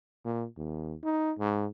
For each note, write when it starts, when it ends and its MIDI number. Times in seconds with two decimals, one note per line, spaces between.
0.25 0.45 46
0.57 0.94 39
1.04 1.32 63
1.39 1.66 44